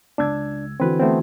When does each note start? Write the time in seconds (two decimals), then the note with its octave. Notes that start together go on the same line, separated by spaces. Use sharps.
0.18 C#2 D4 E6 G#6
0.80 D3 E3 C4 F#4 B4
0.99 A3 B3 C4